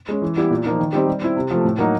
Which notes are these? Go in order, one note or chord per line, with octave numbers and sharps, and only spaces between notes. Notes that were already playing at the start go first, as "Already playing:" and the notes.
G#3 C#4
E3
G3 B3 E4 G4
A#2
F3 A#3 D#4
D#3
G3 C4 D#4 G4
G3
C4 E4
C3
F3 A3
A2
F#3 A#3 D#4 F#4